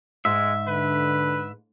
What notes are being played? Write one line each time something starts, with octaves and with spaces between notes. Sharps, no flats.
G#2 G#3 E5
D3 B4